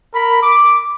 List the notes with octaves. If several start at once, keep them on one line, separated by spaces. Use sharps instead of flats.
A#4 B5
D6